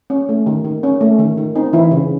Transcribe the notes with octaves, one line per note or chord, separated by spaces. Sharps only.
C#4
A3
D#3
D#3
C#4
A3
D#3
D#3
C4 D#4
E3 E4
C#3